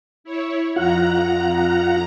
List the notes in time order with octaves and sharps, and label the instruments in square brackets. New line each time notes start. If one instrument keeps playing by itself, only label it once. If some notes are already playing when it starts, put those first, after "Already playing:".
[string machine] E4 C#5
[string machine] F2 A#5 [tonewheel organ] F4 F#5